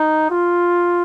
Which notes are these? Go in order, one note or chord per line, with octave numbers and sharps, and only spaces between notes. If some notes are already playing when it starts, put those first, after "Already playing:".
Already playing: D#4
F4